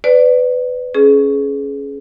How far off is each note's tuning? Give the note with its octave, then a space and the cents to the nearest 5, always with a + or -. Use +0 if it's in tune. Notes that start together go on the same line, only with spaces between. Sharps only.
B4 +25 D5 +0
C#4 +0 G#4 +25